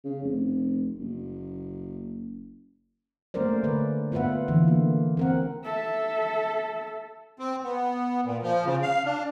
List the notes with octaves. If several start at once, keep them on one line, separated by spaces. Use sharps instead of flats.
C#3
F1
F#1
A3 A#3 C#4 A#4 C5 D5
D3 A3 B4 D5
B3 F4 B4 E5 F#5
D3 E3 F4
A#3
C4 A#4 F#5
A4 E5
C4
B3
A#2
F3
C#3
F5
D4